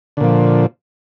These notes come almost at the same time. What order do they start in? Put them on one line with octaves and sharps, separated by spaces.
D3 A#2 F3